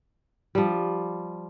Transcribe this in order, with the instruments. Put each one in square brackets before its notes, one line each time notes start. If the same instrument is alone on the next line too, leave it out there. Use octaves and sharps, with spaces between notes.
[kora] F3 G3